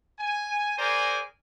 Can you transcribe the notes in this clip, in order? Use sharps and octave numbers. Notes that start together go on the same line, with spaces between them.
G#5
G#4 A#4 C5 D5 G#5 A#5